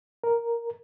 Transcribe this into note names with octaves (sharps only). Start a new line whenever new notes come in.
A#4